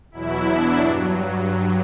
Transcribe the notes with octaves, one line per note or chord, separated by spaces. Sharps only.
E2 B2 F#3 E4
D4
G2 F#3